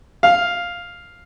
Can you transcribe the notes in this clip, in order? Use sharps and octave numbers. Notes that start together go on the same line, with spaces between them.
F5